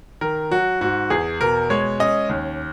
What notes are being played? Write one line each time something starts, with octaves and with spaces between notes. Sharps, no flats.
D#3 A#4
F#3 F#4
G#2 F#4
E2 G#4
B2 A#4
G#3 C#5
C#4 D#5
D#2